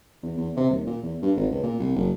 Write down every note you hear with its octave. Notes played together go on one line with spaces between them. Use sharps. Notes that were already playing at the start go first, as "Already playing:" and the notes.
E2
E2
C3
D#1
A#2
E2
G2
G#1
C#2
A#2
C2
F#1